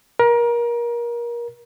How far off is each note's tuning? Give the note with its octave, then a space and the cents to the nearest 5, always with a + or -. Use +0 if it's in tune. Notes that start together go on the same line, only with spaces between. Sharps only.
A#4 +30